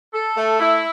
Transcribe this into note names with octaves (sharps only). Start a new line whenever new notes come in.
A4
A3
E4